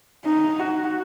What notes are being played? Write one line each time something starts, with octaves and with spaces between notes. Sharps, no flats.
D#4
F#4